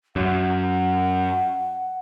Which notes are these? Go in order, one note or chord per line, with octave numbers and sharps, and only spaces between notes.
F#2 F#5